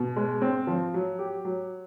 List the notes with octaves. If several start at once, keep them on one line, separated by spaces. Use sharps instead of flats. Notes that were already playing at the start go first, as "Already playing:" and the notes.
Already playing: B2
G#3
C4
F3
F#3
G4
F#3